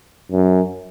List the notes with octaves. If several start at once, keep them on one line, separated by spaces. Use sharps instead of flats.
F#2